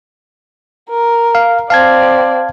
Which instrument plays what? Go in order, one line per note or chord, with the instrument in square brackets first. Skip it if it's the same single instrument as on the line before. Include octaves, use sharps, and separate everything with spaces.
[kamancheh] A#4
[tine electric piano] F5
[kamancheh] C4 D5 [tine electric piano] F5 A5 G#6